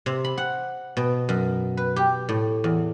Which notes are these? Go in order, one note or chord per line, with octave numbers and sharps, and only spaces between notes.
C3
B5
F#5
B2
F#2
B4
G4
A2
E2